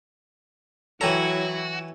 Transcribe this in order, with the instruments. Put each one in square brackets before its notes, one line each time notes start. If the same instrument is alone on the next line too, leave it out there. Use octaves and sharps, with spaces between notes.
[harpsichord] E3 A#5 [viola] F#3 E4 [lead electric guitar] F#4 [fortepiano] A4 C#5 G5